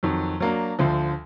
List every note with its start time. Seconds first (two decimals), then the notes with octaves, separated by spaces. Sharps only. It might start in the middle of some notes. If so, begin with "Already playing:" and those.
0.03 F2 D#3 F#3
0.40 F#3 A#3 D4
0.79 D2 D3 F3